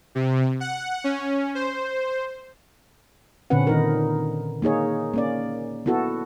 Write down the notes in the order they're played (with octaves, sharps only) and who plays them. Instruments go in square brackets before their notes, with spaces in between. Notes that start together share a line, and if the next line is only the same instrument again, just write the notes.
[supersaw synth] C3
F#5
C#4
C5
[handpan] A#2 D3 C4 C#4 B4 F#5
D#3 D#4 A#4
A#3 D#4 G#4 C#5
A#3 C#4 D5
B3 E4 F#4 A4